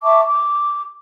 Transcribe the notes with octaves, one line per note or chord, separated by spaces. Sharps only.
E5 A5 C#6 D6
D6